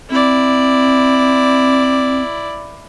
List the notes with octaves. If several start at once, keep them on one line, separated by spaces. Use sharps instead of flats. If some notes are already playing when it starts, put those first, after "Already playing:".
C4 E4 D5